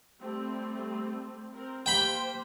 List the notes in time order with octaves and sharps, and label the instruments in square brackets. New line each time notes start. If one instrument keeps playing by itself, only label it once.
[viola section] G3 A3 C4
C4 A#4
[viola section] A#3 G4 C5 [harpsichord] G5 B5